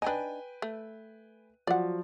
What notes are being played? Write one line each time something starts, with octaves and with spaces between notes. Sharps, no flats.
D4 D#4 B4 G5 G#5
A3
F3 F#3 D5 F#5